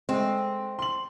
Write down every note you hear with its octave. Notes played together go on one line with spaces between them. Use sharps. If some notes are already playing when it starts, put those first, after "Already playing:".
G#3 A3 C4
C6 F#7